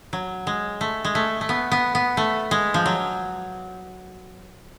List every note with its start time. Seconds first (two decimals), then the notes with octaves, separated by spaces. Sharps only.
0.13 F#3
0.47 G#3
0.81 A3
1.05 G#3
1.15 A3
1.41 A3
1.49 B3
1.72 B3
1.95 B3
2.17 A3
2.51 G#3
2.74 F3
2.86 F#3